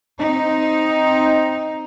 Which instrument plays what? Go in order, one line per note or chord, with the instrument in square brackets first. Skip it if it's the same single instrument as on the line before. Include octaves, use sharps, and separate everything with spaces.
[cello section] C4 D#4